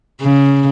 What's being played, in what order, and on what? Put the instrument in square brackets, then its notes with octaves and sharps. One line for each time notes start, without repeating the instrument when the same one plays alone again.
[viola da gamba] C#3